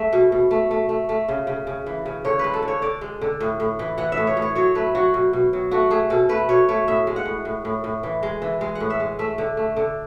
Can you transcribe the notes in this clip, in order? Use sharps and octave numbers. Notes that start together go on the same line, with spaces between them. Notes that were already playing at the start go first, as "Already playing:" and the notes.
Already playing: G#3 A3 E5
B2
B2
A3
A3
A3
A3
C#3
C#3
C#3
E3
C#3
D3 C#5
G#3 B4
A4
D3
C#5
D3 D5
G#3
D3
A2
A2
E3
E3 F#5
E5
A2
C#5
A2
C#5
F#3 C#5
A3 B4
F#3 F#4
B2
B2
F#3
A3 F#4
A3 G#4
B2 A4
A3 B4
B2 C#5
A3 C#5
A2 E5
G#3
F#5
A2
A2
A2
A2
E3
G#3
E3
G#3
F#5
A2
E5
G#3
A3 E5
D3
A3
D3